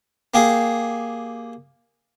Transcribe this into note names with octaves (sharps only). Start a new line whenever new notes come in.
A#3 G4 G#4